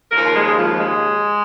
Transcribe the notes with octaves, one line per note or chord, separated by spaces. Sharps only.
D#2 C#3 F3 A#4
G#3
F3
G#3